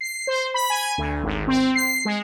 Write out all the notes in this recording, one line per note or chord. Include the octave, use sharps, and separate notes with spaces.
C7
C5
B5
G#5
D2
G#1
C4
C7
G#3